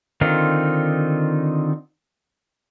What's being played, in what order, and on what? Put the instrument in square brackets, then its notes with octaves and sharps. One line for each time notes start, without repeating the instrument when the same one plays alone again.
[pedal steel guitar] D3 D#3 C4 D#4 F4